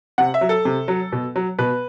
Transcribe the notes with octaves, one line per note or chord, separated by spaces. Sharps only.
C3 F#5
E5
F#3
A4
C3
F#3
B2
F#3
B2 B4